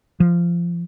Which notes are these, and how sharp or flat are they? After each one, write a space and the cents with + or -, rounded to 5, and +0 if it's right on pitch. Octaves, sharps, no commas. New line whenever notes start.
F3 -20